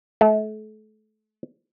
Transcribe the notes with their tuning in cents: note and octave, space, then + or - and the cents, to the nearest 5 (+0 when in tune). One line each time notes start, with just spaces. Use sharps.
A3 -35